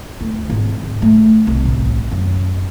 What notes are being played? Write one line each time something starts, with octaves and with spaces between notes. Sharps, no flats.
D2
G#1
C#3
A3
C2
A1
F#2